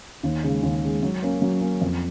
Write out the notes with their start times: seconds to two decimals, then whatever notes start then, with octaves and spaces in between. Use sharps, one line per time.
0.23 D#2
0.43 C#3 G#3
0.63 D#2
0.83 C#3 G#3
1.03 F#3
1.22 A#3 C#4
1.42 F#3
1.61 A#3 C#4
1.82 F2